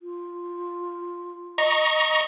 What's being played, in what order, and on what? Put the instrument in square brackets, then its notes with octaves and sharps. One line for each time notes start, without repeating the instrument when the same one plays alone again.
[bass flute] F4
[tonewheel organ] D#5 A#5 C#6